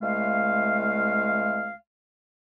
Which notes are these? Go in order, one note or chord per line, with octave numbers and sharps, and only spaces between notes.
C2 G#3 A3 F5